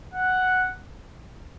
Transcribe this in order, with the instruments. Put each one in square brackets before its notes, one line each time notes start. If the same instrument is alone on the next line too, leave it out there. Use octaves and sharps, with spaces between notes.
[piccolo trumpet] F#5